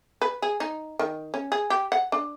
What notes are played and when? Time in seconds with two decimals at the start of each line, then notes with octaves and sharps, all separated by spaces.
0.22 B4
0.42 G#4
0.60 D#4
0.99 D#3
1.34 C#4
1.52 G#4
1.70 G4
1.92 F#5
2.12 D4